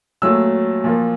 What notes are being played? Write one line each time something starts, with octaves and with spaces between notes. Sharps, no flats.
A#2 F#3 A3 E6
A#2 F3 A#3